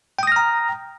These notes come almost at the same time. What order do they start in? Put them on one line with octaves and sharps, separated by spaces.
G5 D#6 A#6 F6 A#5